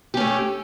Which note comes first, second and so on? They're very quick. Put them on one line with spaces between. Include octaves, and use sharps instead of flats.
G4 C#4 A3